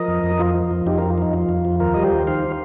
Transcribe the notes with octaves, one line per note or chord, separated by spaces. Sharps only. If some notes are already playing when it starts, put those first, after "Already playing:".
Already playing: F3 A#4 D#5
F2
F2
F3 F4
F3
F2
F2 D#4 G4
F3 F4 A#4
F4
F3 D#4
F2 F4
F2
F3
D#2 F4 A#4
G3 D#5
G4 C5
D#2
D#3 C5 F5